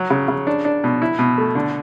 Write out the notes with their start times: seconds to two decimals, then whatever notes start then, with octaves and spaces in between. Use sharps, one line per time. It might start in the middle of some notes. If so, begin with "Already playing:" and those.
Already playing: F#3
0.10 C#3
0.28 C#3
0.47 D4
0.65 D4
0.84 B2
1.02 E4
1.19 B2
1.38 A3
1.55 D3